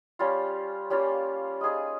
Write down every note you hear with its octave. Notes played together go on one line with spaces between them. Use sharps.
G3 C#4 F4
G3 A#3 C#4 F4
D#4 G#4 D#5